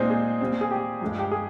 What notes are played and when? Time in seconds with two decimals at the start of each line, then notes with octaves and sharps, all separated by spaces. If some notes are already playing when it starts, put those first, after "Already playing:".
Already playing: A#2 G#3 C4 D#4 C5
0.10 G#4
0.41 A#2 G3 C4
0.61 G#4
0.71 G4
1.01 G2 F3 G#3
1.19 G4
1.31 G#4